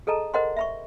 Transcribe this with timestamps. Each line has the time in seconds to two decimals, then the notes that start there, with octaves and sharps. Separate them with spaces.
0.07 G#4 A4 D#5 A5 A#5
0.34 A#4 C5 D#5 F#5 B5 C6
0.57 E5 B5 C#6